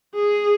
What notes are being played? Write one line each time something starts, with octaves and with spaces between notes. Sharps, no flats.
G#4